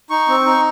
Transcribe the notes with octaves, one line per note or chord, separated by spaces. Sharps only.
D#4 C#6
C4
D#4